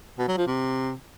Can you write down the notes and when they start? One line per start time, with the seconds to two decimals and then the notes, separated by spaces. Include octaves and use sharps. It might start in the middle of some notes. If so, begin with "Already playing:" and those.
0.19 B2
0.28 F#3
0.37 F3
0.47 C3